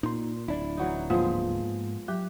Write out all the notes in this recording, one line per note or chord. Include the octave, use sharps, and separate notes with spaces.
A#2 D#4 C6
D1 D4 E4
E3 F#3 D#4
G#2 F3 G#3 A#3 B3 F4 G#4
F#3 G4